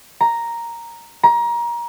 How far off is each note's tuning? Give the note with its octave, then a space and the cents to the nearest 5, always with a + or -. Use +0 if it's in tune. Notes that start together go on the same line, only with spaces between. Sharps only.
A#5 +0
A#5 +25